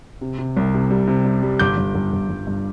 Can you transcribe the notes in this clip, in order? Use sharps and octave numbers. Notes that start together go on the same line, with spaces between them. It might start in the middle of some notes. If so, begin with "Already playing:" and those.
C3
C3
C2
C3
G3
C3
G3
G3
G1 D6 G6
G1
G1
G1
G1
G2